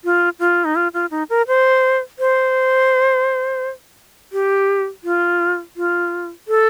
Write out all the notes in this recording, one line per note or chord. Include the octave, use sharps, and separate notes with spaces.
F4
F4
D#4
F4
F4
D#4
A#4
C5
C5
G4
F4
F4
A4